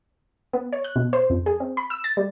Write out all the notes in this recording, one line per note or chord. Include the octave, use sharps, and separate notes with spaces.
B3
C#5
F#6
B2
C5
F2
G#4
C4
B5
E6
A6
G3